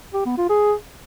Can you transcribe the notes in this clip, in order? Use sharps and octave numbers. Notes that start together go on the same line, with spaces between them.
G4
B3
F4
G#4